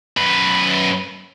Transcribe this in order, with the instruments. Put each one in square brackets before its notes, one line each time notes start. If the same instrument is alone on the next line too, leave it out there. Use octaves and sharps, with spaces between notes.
[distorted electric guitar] F#2 B4